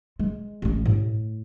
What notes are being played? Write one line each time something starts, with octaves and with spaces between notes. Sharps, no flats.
G#3
A1 C#4
A2